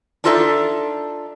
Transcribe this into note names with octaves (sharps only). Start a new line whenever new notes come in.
D4 D#4 F4 A4 C5 E5